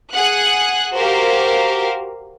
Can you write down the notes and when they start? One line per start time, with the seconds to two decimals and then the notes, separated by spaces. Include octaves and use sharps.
0.13 G#4 F#5 F#6
0.93 F#4 G4 A#4 C5 F5